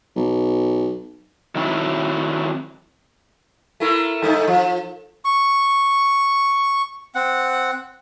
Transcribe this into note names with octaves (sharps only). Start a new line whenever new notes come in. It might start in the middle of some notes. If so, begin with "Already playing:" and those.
B1
D#3 F#3 C4 E4
A3 E4 A#4
G2 A3 D#4
F3
C#6
C4 F#5